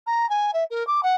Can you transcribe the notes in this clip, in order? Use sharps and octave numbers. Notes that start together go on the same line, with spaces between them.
A#5
G#5
E5
A#4
D6
F#5